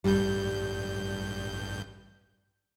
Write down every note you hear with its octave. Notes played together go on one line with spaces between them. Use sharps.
A1 G2 G3 G6